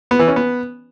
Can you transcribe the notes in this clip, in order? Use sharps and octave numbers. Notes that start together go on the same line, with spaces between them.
B3
E3
C#4
B3